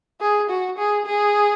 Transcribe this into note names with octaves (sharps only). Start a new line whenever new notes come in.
G#4
F#4
G#4
G#4